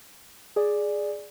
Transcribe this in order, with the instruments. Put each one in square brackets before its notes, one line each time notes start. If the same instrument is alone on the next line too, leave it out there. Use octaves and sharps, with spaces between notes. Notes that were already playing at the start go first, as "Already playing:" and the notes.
[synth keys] G#4 D5